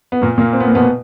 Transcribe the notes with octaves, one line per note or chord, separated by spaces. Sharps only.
B3
A#2 A#3
A#2 A#3
C4
B3
A#3
B2 B3